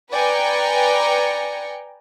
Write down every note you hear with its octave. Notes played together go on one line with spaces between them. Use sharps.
B4 D5 G5 G#5 A#5 C#7